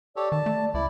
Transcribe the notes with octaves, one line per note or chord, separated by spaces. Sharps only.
G4 A4 C#5 D5
D#3 A5
A3
C#2 E4 D5 B5